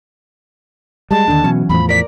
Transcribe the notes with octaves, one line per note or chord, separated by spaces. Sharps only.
G3 G#3 A5
D#2 D3 D#3 D4
B2 E3 F#3 C#4
E2 A2 F3 B5
A#4 D5 B6